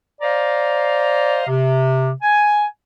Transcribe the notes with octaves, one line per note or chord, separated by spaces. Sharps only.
C5 D5 D#5 F5 A#5
C3
G#5